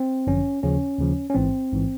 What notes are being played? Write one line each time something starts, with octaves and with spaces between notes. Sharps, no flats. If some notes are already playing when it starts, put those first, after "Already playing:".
Already playing: C4
G1 F#2 D3 F3 C#4
D#2 C#3 F3 C#4
D#2 C#3 F3
C#4
A1 G#2 E3 C4
A1 G#2 E3